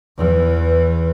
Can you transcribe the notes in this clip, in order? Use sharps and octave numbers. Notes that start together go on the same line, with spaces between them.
E2 E3